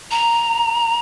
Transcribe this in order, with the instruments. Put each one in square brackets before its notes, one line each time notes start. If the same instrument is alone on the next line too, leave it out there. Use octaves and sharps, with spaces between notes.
[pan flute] A#5